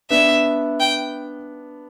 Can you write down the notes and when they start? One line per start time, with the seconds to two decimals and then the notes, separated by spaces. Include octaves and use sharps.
0.10 B3 D4 E5
0.80 G5